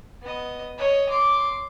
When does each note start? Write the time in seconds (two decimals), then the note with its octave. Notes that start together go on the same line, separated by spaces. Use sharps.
0.22 B3 D#5
0.78 C#5 D#5
1.09 C6 D6